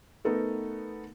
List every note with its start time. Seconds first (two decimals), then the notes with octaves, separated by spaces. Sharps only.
0.25 A3 B3 D#4 A4 A#4